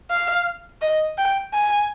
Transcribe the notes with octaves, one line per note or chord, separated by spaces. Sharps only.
F5
D#5
G5
G#5